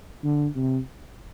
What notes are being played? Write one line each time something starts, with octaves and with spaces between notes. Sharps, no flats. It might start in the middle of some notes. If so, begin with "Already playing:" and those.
D3
C3